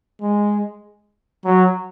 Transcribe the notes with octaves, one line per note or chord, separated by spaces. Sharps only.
G#3
F#3